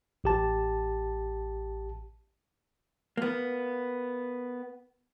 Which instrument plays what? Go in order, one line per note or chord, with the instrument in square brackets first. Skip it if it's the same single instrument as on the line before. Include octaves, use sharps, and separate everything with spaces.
[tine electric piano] A1 G4 A5
[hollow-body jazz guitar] A#3 B3